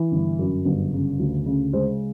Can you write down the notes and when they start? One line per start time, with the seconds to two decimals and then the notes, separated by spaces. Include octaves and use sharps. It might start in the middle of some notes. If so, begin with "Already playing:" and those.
Already playing: E3
0.12 G1
0.39 F#2
0.65 G1
0.93 C#3
1.20 D2
1.46 C#3
1.73 G#3 C5